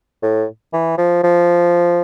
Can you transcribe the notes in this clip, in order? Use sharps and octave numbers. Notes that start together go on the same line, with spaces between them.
A2
E3
F3
F3